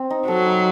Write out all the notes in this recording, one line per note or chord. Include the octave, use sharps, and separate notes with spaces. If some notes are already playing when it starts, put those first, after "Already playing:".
Already playing: C4
D#4
F#3 A4
D#4